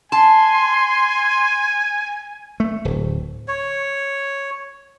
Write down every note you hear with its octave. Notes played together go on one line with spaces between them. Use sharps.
G#5 A5 C6
A3
D1
C#5